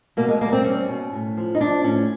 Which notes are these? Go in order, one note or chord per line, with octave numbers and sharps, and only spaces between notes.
B2 A#3
G#3
G3 A#3
C4
G3 C#4
B2
A2
F3
D#4
F3 D4
A2 C#4